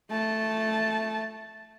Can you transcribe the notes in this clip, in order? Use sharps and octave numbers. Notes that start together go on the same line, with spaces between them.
A3 A5